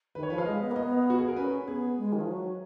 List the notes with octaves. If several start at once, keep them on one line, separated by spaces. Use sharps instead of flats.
D#3 B4
C#5
F3 B4
F5
G#3 D#5
B3
A#3
B3 D#5
F#4
G#4
A#4
C#4 B4
B3 G#4
G#3
D#3
F3
F#3